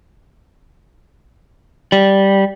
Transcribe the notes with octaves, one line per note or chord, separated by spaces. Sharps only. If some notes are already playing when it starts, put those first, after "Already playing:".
G3